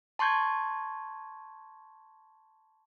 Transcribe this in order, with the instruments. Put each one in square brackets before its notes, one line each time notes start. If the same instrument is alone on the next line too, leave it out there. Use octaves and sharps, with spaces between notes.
[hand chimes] A5 C6 C#6 G6 G#6